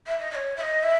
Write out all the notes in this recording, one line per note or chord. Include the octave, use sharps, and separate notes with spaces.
E5
D#5
D#5
C#5
E5
D#5
E5